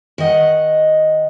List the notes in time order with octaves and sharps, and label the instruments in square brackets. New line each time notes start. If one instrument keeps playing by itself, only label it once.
[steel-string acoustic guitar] D#3 D#5 F#5